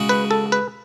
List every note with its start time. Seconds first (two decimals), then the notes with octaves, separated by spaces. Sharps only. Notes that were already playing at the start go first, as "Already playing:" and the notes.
Already playing: C#3 G#3 C#4 F#4
0.09 B4
0.31 A4
0.52 B4